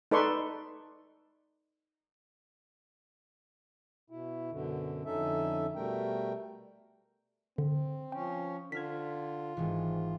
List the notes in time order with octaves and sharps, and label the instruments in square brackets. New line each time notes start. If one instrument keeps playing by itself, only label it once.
[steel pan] D#4 A4 B4 D5 C6 C#6
[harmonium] B2 E4
F#2 B2 D3
F2 D3 C#4 D#4 A4 E5
B2 G3 A3 A#4 G5
[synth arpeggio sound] D3 [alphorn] C4
[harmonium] F3 C#4 [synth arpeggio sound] G5
[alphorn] D3 [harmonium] F4 [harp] C5 F6 G#6 [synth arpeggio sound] B6
[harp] G#1 E3 [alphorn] G#2